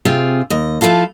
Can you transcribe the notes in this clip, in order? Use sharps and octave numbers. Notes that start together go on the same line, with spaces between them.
C3 C4 F4 G#4
D#2 D#5
F3 A3 E4 F4 A4